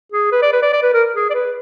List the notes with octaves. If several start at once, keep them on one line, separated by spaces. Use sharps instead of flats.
G#4
B4
D5
B4
D5
D5
B4
A#4
G#4
D5
B4